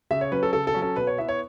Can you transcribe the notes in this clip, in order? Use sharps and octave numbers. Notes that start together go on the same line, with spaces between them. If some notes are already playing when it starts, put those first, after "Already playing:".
C#3 E5
C#5
F#3 C#4 B4
A4
C#3 A4
A4
F#3 C#4
A4
B2 B4
C#5
B3 E4 E5
C#5